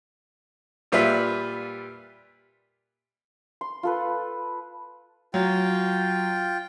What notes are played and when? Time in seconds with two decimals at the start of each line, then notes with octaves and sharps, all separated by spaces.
0.92 A#2 G3 F4 B4 E5 B5
3.61 C6
3.83 F4 A4 B4
5.34 F#3 F4 G5